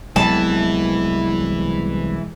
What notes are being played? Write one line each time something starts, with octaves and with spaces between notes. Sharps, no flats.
C2 E3 F#3 G#3 B3 A5